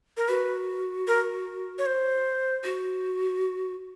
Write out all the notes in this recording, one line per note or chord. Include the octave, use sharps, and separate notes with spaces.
A#4
F#4 B4
A#4
C#5
C5
F#4